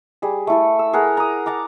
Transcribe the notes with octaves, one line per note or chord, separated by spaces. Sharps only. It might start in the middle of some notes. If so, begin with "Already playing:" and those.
G3 G#4
A3 E4 A4
E6
G#4 A#4 F#5 A#5
A#5 D#6
F#5 A5 A#5 D6